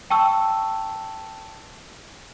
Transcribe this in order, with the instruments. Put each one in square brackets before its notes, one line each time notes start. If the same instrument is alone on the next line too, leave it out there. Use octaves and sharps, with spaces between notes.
[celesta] G5 A5 C#6 E6